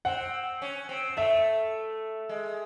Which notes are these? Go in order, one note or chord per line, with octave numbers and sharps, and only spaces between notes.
C4 F#5
C#4
C4
A3 E5
G#3